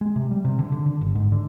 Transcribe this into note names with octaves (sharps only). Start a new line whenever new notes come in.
G#3
C3
G3
C3
D3
D3
D3
G1
G#2
D3